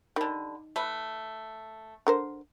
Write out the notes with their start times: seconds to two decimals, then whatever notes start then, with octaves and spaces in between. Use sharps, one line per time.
0.16 D3 D#3 G3
0.76 A3 B4
2.07 D3 A#4 C5